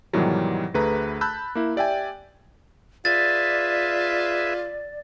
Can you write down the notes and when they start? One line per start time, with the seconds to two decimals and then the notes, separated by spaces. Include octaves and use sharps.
0.13 G#2 B2 D#3 E3 F#3 G3
0.74 D2 A3 G#4 B4 A#5
1.21 A5 B5 E6 F#6 G6
1.55 A#3 E4
1.76 G4 D5 E5 G5 G#5
3.05 F4 G#4 B4 D5 E5 A6